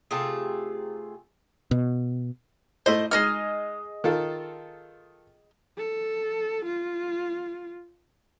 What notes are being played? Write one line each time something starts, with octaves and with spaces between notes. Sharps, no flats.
C3 A3 F4 G#4
B2
A3 E4 C5 D#5
G#3 D#4 G#4 D#5 F6
D#3 F4 A4
A4
F4